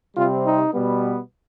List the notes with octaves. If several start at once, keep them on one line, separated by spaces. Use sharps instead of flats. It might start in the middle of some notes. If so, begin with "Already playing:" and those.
C3 G3 C4 F4
D#4
B2 G3 B3